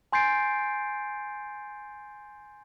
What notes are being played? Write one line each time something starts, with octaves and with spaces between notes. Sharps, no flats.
G#5 C6 G6 A6 C7 D7